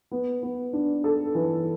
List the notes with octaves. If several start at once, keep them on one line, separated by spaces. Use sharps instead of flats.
B3
B3
D4
A4
E3